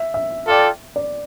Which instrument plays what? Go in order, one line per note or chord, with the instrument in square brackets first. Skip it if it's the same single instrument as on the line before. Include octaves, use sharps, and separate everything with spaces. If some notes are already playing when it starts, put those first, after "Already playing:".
Already playing: [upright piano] E5
E5
[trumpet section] F4 A4 D5 G5
[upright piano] D5